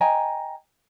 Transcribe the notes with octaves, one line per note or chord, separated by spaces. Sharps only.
D#5 G5 G#5 A#5